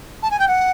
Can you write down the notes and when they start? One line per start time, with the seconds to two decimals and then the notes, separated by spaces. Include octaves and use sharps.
0.23 A5
0.31 G#5
0.39 G5
0.48 F#5